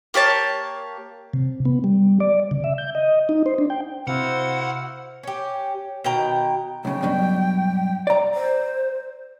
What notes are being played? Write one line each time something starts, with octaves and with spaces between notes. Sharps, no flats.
A#3 G4 C#5 A5
C3
B3
G3
D5
C#3
E5
G6
D#5
D#4
C5
D4
G5
C3 E4 F#4 C5 F5 F#5
C#4 G4
B2 D#3 G5 A#5
B1 C#3 G5
G2 B2 F#3
D5 A#5
C5